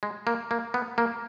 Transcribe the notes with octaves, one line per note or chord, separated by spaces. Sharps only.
G#3
A#3
A#3
B3
A#3